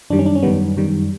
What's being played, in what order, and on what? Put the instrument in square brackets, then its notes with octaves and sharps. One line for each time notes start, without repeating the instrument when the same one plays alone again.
[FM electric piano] F#2 D#3 G3 D4
C#4
D4
C#4
F#2 D#3 G3 B3
F#2 D#3 G3